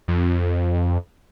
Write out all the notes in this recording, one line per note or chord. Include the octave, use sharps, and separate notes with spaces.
F2